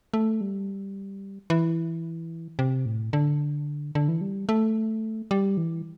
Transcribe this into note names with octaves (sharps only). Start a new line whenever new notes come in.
A3
G3
E3
C3
A2
D3
D3
E3
G3
A3
G3
E3